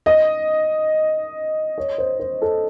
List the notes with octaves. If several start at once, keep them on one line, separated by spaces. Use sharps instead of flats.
D#5
C#5
C5
C5
A4